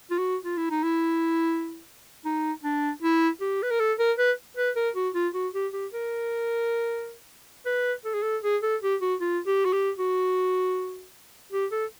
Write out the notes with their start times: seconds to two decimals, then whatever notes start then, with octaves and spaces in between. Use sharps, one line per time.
0.11 F4
0.18 F#4
0.45 F4
0.57 E4
0.71 D#4
0.83 E4
2.25 D#4
2.64 D4
3.02 E4
3.41 G4
3.63 B4
3.71 A#4
3.80 A4
3.99 A#4
4.18 B4
4.57 B4
4.76 A#4
4.96 F#4
5.15 F4
5.34 F#4
5.54 G4
5.73 G4
5.92 A#4
7.66 B4
8.05 A4
8.14 G#4
8.22 A4
8.43 G#4
8.62 A4
8.82 G4
9.01 F#4
9.21 F4
9.46 G4
9.65 F#4
9.73 G4
9.99 F#4
11.53 G4
11.72 A4